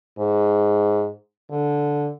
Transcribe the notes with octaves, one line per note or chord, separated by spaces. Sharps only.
G#2
D3